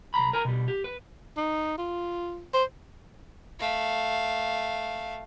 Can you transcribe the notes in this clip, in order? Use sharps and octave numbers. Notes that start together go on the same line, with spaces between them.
C2 G2 A#5 B5
A#4 G#5 A#5
B2 G3
G4
B4
D#4
F4
C5
A3 F5